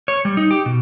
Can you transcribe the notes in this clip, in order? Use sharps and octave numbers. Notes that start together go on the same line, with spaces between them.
C#5
G3
D#4
G4
B2